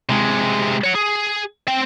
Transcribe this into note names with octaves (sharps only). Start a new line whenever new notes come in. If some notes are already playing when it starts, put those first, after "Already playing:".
C3 G#3
C#5 F#5
G#4
C4 G5